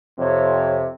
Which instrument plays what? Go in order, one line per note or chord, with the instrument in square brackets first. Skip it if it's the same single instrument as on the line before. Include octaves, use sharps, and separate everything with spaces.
[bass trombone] F2 [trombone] C3 [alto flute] C#5